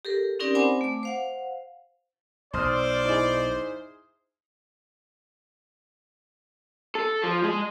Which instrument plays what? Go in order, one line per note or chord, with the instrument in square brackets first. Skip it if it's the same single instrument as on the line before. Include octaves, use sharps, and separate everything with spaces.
[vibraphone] G4 A4 A#4
C4 C#4 D#4 G4 A#4 D5
C4 C5 F#5 G#5 B5 D6
A3 D6
C5 F5 F#5
[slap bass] B1 [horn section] C5 [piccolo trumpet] D5 [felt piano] C6 D#6 F6
[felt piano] D#4 E4 G#4
[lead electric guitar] A4
F3
G#3